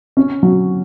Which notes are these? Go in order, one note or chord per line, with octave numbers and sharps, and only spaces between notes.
C#4
F#3